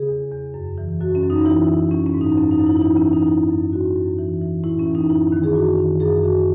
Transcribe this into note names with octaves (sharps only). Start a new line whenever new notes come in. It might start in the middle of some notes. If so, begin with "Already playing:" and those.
Already playing: C#3 G#4
E2
E2
F#2
E3
F#2 F#4
C#4
F#2
D#4
E3 E4
E3
E3 C#4
C#4
G#2
D#4
F#2 C#4
D#4
F#2
E4
E4
E3 D#4
C#4
E3
D#4
F#2 E4
F#2
F#2 F#4
F#2
E3
E3
A2 E4
C#4
E3
D#4
F#2 E4
D#3
G#4
F#2 F#4
D#3
F#2 G#4
F#2 F#4